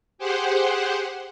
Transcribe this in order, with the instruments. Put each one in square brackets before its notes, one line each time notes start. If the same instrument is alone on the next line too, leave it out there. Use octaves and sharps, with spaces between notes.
[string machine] G4 G#4 C5 F#5